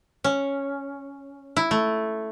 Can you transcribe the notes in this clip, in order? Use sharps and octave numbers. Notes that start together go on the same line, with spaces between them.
C#4
E4
A3